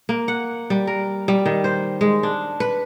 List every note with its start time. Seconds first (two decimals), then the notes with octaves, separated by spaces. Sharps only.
0.09 A#3
0.28 F#5
0.70 G3
0.87 A#4
1.28 G3
1.46 D#3
1.64 C5
2.01 G#3
2.23 D4
2.60 B4